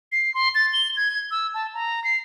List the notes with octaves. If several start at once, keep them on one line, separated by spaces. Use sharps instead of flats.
C7
C6
A6
G7
G#6
E6
A5
A#5
C7